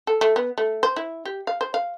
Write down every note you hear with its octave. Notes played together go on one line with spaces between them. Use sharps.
A4
A3
B3
A3
C5
E4
G4
F5
C5
F5